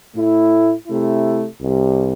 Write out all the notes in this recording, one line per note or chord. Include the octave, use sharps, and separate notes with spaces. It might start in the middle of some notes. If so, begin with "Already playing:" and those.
A2 A3 E4
C3 A3 E4
C2 C3 G3